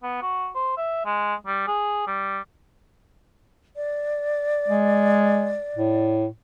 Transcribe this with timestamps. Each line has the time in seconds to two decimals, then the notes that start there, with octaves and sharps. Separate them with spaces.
0.03 B3
0.22 F#4
0.55 C5
0.77 E5
1.05 G#3
1.47 G3
1.67 G#4
2.07 G3
3.76 D5
4.68 G#3
5.77 A2